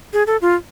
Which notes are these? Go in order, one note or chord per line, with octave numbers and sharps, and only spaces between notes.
G#4
A4
F4